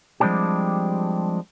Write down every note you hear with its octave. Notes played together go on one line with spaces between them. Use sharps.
F3 G3 G#3 C4 D4 G4